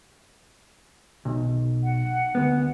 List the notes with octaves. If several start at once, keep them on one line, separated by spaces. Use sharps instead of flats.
B1
F#5
D2 B3